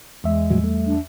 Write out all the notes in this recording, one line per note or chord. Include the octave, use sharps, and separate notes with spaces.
E2 G#3 E5
A2 F3 F#3
G3 A3
D4